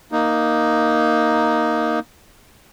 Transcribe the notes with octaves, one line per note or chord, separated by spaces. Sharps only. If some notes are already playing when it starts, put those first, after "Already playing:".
A#3 D#4